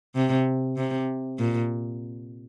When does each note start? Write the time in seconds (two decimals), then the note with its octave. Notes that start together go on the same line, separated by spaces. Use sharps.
0.15 C3
0.77 C3
1.39 A#2